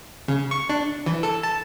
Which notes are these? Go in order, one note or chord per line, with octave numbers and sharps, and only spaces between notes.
C#3
C#6
D4
E3
A4
A5